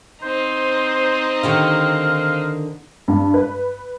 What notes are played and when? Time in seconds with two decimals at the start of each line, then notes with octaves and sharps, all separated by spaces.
0.23 C4 D#4 C5
1.43 D3 D#3 G4 F5
3.08 G2
3.34 B4